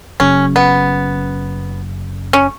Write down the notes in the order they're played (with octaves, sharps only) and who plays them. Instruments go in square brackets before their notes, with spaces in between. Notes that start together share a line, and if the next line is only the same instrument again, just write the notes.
[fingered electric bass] F#1 F#2 C#3 [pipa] C#4
[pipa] B3
C#4